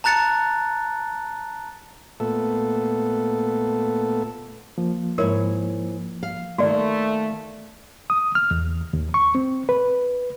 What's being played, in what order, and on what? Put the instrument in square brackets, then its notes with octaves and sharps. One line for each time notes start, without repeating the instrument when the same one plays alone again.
[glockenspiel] A5 A#5 F#6 A6 C#7
[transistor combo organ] A#2 A3 B3 A4
[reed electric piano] F3 A#3
[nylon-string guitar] G#2 E4 C#5 [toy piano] A#4
[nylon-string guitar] F5
[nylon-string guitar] D#3 A#3 [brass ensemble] A3 [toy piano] F#4 D5
[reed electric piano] D#6
F6
E2
D#2
C#6
C4
B4